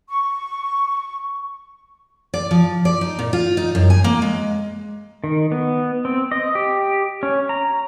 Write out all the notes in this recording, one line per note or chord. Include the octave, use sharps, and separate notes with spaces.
C#6
D5
F3
D5
D#4
A#2
F4
D#4
F#2
G#5
A#3
G#3
D#3
B3
C4
D#5
G4
C#4
A#5